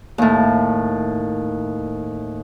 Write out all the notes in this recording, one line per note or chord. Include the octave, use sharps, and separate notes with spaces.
D#2 A2